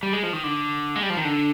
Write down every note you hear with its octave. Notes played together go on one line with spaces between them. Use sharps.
G3
G#3
F3
D#3
D3
G#3
G3
F3
D#3
D3